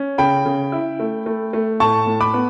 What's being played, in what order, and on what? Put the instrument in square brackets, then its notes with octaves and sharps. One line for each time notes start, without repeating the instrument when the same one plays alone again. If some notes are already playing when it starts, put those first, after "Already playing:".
Already playing: [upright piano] C#4
C#3 G5 B5
C#3
E4
A3
A3
A3
A2 A5 C#6
A2
B5 D6
B3